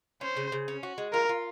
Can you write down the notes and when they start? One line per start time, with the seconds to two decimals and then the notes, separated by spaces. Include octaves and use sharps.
0.21 C#4 C5
0.37 C#3
0.52 C#3
0.68 C#4
0.83 F#4
0.98 G#3
1.13 F4 A#4
1.29 F4